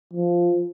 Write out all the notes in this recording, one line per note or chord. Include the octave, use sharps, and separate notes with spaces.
F3